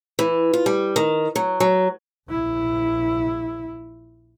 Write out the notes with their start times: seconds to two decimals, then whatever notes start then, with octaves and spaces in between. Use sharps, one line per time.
0.19 E3
0.54 F4
0.66 G3
0.96 D#3
1.36 F#3
1.60 F#3
2.29 A#1 E4